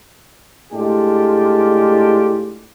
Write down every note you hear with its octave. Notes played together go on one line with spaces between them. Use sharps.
A2 G#3 D4 F4 G4